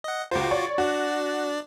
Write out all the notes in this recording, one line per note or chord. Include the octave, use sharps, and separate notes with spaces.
D#5 F#5
C#2 F4 F#4 C5 D6
C#5 D5 C#6
D4 F#4 D5